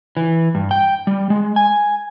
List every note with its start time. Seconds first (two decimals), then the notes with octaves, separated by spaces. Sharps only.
0.17 E3
0.55 G2
0.71 G5
1.07 G3
1.30 G#3
1.56 G#5